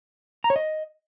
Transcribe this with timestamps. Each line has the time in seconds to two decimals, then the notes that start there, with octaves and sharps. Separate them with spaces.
0.44 A#5
0.50 C#5
0.56 D#5